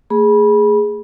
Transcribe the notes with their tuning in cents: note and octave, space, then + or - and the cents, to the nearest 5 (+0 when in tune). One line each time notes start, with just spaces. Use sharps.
A3 +30 G#4 +0 B5 -25